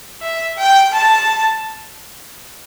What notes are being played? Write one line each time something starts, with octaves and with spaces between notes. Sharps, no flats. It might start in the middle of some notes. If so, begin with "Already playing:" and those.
E5
G5
A5